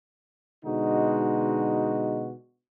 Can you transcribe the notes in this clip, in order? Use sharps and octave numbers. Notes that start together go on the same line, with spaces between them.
B2 D3 G#3 D#4 F#4